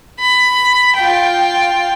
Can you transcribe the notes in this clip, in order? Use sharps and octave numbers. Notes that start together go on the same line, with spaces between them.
B5
F4 G5